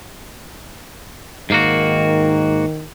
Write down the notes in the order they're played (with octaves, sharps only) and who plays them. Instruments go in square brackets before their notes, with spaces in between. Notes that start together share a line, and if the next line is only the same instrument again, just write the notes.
[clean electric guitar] G#2 A#3 F#4 [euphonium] D#3